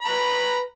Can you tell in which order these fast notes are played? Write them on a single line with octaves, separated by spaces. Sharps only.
B5 A#5 B4